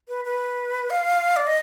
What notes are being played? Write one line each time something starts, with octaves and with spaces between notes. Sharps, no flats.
B4
B4
F5
D5
D#5